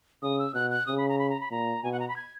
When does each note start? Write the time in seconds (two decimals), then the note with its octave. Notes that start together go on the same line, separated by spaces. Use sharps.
0.22 C#3 D#6
0.39 E6
0.54 B2 F#6
0.71 F#6
0.86 C#3 D#6
0.98 B5
1.09 A#5
1.19 B5
1.30 A#5
1.40 B5
1.51 A#2 A#5
1.84 B2 G#5
1.92 F#5
2.00 A#5
2.08 B5
2.16 G#6